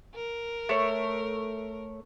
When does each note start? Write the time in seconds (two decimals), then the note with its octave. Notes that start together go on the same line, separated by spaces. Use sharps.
0.15 A#4
0.69 A3 C#5